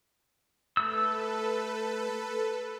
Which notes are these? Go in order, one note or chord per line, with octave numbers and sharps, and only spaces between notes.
A3 A4 B4 E6